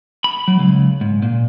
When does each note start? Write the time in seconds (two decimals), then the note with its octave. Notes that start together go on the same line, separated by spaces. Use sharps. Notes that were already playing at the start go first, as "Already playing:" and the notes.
0.24 B5
0.48 F#3
0.59 C#2
1.01 G#2
1.23 A#2